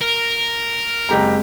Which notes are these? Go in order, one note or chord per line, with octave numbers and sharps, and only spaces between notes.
A#4
F#1 G#3 C4 G4 G#4 A#5